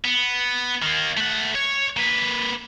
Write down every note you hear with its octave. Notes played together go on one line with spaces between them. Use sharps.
B3
D#3 A#3
A3 F#5
C#5
A#3 B4